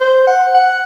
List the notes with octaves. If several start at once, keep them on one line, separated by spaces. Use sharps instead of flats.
C5
F#5
F#5